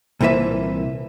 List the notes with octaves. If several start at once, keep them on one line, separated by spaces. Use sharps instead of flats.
C2 A#2 E3 B4 E5